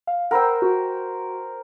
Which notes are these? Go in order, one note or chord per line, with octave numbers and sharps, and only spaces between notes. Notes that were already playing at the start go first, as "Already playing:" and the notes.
F5
A#4 C5 F#5 G5 B5 E6
F#4